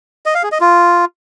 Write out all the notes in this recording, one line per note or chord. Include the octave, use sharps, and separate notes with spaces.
D#5
F5
G#4
D#5
F4